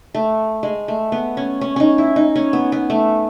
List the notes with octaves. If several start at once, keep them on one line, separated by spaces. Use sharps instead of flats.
A3
G#3
A3
B3
C#4
C#4
C#4 D#4
E4
D#4
C#4
B3
B3
A3